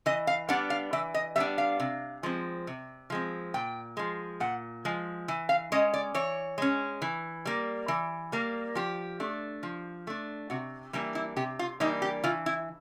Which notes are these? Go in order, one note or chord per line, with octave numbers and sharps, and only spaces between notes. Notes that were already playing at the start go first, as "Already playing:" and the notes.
E3 D#5
F5
G3 B3 D4 F#5
F5
E3 E5
D#5
G3 B3 D4 E5
F5
C3
F3 G#3 C4
C3
F3 G#3 C4
A#2 G5
F3 G#3
A#2 F#5
F3 G#3
E3
F5
G#3 C#4 D#5
D5
E3 C#5
G#3 C#4
E3
G3 A#3
E3
G3 A#3
F3 G4
A3 D4
F3
A3 D4
C3 F#4
E3 G3 A#3 D4 E4
E4
C3 G4
F4
E3 G3 A#3 D4 D#4
G4
E3 F4
E4